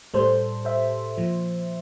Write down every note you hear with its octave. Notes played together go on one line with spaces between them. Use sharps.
A2 G3 A4 C5
C5 E5
A#2 F3